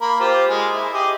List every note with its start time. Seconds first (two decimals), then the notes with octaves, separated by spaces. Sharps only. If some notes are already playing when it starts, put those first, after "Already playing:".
0.01 A#3 A#4 B5
0.20 F4 G4 C5
0.49 G#3 G#5
0.72 E4
0.93 G4 G#4 D#5